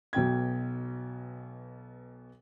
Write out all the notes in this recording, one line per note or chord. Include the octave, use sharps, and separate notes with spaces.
B1 B2 G5 G#6